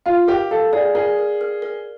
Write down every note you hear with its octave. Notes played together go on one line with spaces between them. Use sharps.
F4 F5
G4 A#4
A4 F5
G#4 D5
G#4 A#4
A#4
A#4
A#4